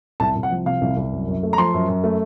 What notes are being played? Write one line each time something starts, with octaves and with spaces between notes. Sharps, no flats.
C2 A5
C2
F#5
F3
C3 F5
C2
C2
F#2
F#2
A3
A#5
F3 C6
F#2
F#2
A3